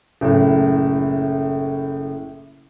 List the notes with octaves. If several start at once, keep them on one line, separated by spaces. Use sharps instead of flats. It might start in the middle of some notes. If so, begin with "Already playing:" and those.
F#1 A2